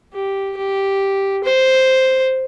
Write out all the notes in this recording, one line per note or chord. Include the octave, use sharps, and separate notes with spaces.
G4
G4
C5